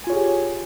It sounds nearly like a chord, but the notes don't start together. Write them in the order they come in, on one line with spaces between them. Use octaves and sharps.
G#5 F4 C#5 G#4 G4